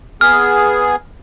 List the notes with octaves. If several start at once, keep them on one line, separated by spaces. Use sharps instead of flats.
B3 G#4 F6